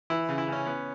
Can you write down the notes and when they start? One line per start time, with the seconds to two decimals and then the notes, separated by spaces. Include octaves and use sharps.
0.10 E3 E4
0.29 C#3
0.38 E4
0.48 C#3 C#4
0.67 B3